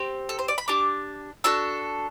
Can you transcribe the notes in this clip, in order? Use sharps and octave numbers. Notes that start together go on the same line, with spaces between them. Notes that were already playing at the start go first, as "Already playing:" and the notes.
Already playing: C4 G4
A4
C5
D5
B5
D4 G4 D6
D4 F#4 A4 E6